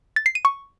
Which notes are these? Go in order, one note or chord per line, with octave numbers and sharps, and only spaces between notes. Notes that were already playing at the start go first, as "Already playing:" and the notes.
A6
C7
D#7
C#6